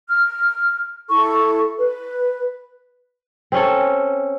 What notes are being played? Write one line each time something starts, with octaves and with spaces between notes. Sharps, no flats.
F6
E4 A4 C#6
B4
C4 C#4 A4